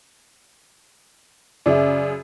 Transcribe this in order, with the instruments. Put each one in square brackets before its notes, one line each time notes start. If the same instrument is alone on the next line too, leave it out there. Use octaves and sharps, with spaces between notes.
[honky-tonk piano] F#2 C#3 [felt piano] D5 E5